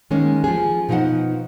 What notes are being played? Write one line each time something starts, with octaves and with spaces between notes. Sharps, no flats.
D#3 G#3 A#3 C#4
F3 G#4
B2 F3 D#4 E4 C5 F#5